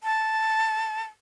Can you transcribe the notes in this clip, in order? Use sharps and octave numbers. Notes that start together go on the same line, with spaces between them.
A5